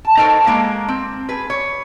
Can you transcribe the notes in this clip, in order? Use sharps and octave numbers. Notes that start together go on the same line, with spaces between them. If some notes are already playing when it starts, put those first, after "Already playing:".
A5
D#4 A4 A#4 C5 C#5
G#3 A#3 A#4 F5 A5
C4
G#4 B4
C#5